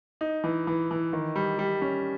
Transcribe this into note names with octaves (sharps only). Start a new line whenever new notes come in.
D#4
E3
E3
E3
D#3
G3
G3
C#4